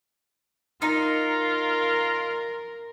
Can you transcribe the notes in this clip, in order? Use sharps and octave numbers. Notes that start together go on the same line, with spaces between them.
D#4 F4 A#4